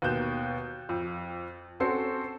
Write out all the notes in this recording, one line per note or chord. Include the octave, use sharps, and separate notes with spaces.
D#2 B2 F#6 G6 E7
F2
C4 C#4 F#4 A4 C5 C7